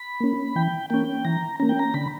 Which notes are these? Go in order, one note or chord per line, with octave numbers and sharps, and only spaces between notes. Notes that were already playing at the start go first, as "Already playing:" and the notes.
Already playing: B5
A#3 C#4
E3 G5
A#3 C#4 G5
E3 A#5
A#3 C#4 A#5
G5
A#5
D3 B5